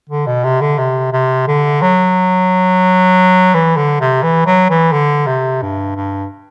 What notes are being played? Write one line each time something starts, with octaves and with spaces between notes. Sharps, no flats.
D3
B2
C3
D3
C3
C3
D3
F#3
E3
D3
C3
E3
F#3
E3
D3
C3
G2
G2